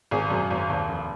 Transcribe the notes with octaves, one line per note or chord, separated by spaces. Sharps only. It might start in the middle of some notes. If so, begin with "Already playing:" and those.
G#1 G#4
F#2
G#1
D#2
F1